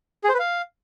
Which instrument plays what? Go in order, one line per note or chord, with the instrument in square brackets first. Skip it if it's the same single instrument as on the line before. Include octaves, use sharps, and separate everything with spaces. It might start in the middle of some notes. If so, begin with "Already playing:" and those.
[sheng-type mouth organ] G#4
C5
B4
F5